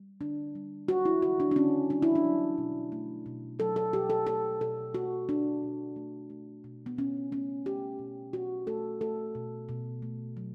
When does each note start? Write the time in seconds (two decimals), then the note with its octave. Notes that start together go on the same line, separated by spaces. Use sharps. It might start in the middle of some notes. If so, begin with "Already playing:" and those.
Already playing: G3
0.21 D3 D4
0.55 G3
0.88 G3 F#4
1.05 E4
1.22 D3 F#4
1.40 D4
1.51 D4
1.56 D3 C#4
1.90 G3 D4
2.02 E4
2.15 D4
2.25 F#3
2.58 B2
2.92 A3
3.26 B2
3.59 F#3 A4
3.76 A4
3.93 B2 G4
4.10 A4
4.27 A3 A4
4.61 B2 A4
4.94 A3 F#4
5.28 B2 D4
5.63 B2
5.96 A3
6.30 A3
6.64 B2
6.86 B3
6.97 B2 C#4
7.32 A3 C#4
7.66 A3 G4
7.99 B2
8.33 B2 F#4
8.67 A3 A4
9.01 A3 A4
9.35 B2
9.69 B2
10.02 A3
10.37 F#3